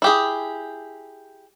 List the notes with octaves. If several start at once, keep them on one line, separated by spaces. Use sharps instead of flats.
E4 G4 G#4